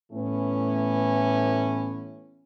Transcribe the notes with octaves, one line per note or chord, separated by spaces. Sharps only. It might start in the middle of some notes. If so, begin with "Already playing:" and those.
A2 E3 A3 B3 C#4